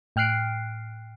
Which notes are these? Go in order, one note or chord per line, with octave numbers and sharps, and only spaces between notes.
A2 G5 F6 F#6 C7 D7